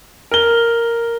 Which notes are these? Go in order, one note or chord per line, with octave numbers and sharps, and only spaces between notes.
A#4 G7